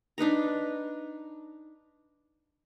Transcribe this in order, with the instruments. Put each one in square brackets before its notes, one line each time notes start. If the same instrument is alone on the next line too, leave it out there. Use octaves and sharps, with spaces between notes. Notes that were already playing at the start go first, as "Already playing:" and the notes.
[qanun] D4 D#4 B4 A#5